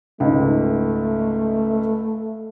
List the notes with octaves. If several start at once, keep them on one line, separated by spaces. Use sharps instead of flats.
C#2 G#2 A3